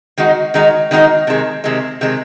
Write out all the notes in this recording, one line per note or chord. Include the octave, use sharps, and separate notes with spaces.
D#3 G#3 D#4 F#4
D#3 G#3 D#4 F#4
D#3 G#3 D#4 F#4
C3 D#3 G#3
C3 D#3 G#3
C3 D#3 G#3